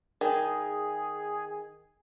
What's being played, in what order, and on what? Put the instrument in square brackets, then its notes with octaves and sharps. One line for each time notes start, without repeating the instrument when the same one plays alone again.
[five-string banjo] D#3 [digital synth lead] G#4